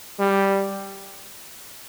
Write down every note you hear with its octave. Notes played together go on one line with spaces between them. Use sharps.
G3